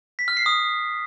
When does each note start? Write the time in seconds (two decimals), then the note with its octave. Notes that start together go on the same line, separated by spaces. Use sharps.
0.19 B6
0.28 F6
0.37 C7
0.46 D#6